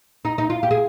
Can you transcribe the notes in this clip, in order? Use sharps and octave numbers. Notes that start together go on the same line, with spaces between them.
D#4
D#4
F4
G4
G#4